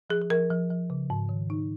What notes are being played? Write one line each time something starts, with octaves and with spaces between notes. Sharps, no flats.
F3 G#4
G#4
F3 A#4
F3
F3
C#3
G#2
D#3
D#4